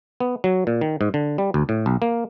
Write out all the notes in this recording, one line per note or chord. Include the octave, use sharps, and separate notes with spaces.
B3
F#3
A#2
D#3
G#2
D3
G3
D2
A2
B1
A#3